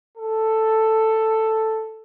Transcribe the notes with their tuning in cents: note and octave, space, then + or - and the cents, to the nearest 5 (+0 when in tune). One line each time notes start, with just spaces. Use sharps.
A4 +5